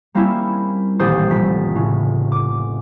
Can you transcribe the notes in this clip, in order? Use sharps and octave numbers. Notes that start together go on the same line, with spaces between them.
G3 A#3 C4 C#4 E4
D#1 A1 G4 C5 D#6 A6
F1 B6
A2 C#3
D6